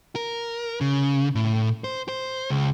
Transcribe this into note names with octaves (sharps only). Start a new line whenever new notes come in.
A#4
C#3
A2
C5
C5
C#2